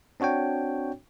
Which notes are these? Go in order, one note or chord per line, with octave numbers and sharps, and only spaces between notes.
C4 D4 F#4 C#5 G5